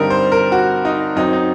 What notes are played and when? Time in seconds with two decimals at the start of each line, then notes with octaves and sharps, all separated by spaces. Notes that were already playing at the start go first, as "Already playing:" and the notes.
Already playing: G2 D3 G3 C4 D#4 A#4
0.10 C5
0.32 A#4
0.52 F#4
0.85 D#4
1.16 F#2 F#3 C4 D#4
1.33 D#4